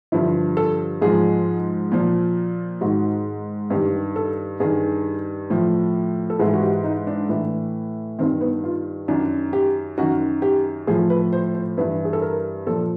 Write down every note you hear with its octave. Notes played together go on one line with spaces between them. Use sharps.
G2 D3 F3 E4
A4
G#2 F3 G#4
A#2 F3
G#2 D#3 F#4
G2 D#3 G4
A4
G2 D#3 G#4
A2 F3
A4
G#2 E3 G#4
F#4
G4
D#4
D4
A2 E3
G2 D#3 C4
B3
F4
F#2 D#3 D4
G4
F#2 D#3 F#4
G4
A2 F3 G#4
B4
C5
C5
G2 E3 B4
G#4
A4
A#4
A#2 F3 A4